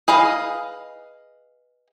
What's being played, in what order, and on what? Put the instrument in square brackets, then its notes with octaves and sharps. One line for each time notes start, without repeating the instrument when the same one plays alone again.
[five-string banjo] G#4 B4 D#5 F5